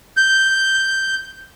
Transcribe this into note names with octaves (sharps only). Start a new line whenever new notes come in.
G6